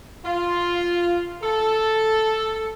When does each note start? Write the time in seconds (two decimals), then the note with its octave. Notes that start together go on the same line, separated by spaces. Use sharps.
0.24 F4
1.42 A4